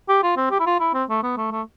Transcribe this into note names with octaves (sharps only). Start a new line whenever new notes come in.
G4
F4
C4
G4
E4
F4
E4
C4
A3
B3
A3
A3